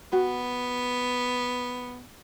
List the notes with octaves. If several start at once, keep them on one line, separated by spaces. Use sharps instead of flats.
B3 F#4